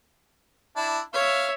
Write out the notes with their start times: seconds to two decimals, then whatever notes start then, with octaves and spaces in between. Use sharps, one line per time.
0.76 D4 E4
1.14 C#5 E5 F5